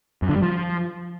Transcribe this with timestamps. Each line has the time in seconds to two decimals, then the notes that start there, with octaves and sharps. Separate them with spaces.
0.22 F#2
0.29 D3
0.36 G3
0.43 F3